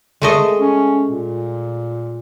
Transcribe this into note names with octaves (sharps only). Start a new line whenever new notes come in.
G#3 A3 D#5
C#4
A#2